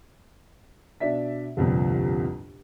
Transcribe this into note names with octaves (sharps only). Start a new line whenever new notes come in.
B2 D4 D5 E5 B6
G1 C2 F2 A#2